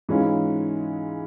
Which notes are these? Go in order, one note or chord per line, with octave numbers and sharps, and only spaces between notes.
G#2 E3 G#3 C#4 F4